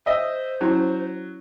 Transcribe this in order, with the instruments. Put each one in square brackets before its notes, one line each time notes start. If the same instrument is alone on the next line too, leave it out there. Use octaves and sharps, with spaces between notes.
[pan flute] C5 [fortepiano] D#5 E5
[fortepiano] F#3 [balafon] C#4 E4